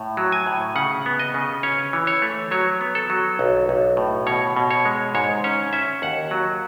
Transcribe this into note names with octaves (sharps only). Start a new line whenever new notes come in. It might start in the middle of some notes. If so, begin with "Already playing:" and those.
Already playing: A2
F#3
G#5
A2
C#3 F#5
B3
D#5
C#3
C#4 C#5
E3
C#5
A3
F#3 C#5
B3
A4
F#3
B1
B1
A2
B2 C#5
B2
C#5
G#3
G#2 C#5
C#4 C#5
C#4 E5
D#2 F#5
F#3